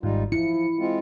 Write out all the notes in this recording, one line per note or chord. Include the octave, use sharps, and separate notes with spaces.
G#1 G#2 G3 D#4 F4
F3 E4 C#7
G#3 C4 F4